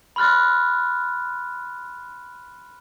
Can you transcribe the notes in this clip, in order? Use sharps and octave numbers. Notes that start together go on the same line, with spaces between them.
B5 C6 F6 F#6 A6